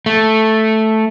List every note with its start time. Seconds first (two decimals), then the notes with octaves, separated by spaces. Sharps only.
0.06 A3